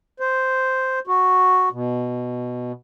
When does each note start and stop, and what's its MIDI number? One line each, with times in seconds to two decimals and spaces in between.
0.20 0.99 72
1.07 1.69 66
1.72 2.72 47